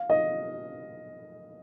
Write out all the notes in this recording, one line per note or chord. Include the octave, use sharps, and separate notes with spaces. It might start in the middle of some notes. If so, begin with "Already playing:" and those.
Already playing: F5
D#5